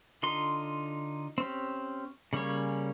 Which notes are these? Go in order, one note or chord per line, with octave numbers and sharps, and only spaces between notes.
D3 D#4 F4 C6
C4 C#4 G4
C#3 G3 A#3 C#4 C#5